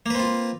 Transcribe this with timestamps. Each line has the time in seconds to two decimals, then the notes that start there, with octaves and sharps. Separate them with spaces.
0.06 A#3
0.10 B4
0.15 C4
0.19 F4